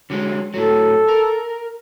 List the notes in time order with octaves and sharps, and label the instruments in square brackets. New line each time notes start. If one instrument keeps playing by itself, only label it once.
[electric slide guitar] D3 F#3 G#3
[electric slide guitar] A2 F#3 [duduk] A4
[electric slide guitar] A#4